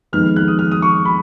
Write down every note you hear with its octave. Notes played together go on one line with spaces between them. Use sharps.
F2 D#3 G#3 B3 D#4 F6
F#6
D#6
F6
D#6
C#6
B5